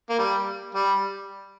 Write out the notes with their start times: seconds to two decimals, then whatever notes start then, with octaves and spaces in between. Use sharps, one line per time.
0.10 A#3
0.19 G3
0.75 G3